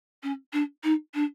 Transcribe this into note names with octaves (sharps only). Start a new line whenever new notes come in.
C#4
D4
D#4
D4